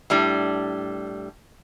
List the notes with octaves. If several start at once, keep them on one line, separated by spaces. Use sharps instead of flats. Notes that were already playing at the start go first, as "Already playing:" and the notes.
A2 G3 D4